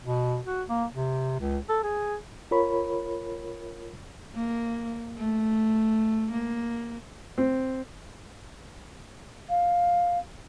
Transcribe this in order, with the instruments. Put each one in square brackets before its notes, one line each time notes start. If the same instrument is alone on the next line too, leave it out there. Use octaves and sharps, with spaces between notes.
[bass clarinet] B2
F#4
A#3
C3
C#2
A4
G#4
[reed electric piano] F4 A#4 C#5 B5
[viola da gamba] A#3
A3
A#3
[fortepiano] C4
[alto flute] F5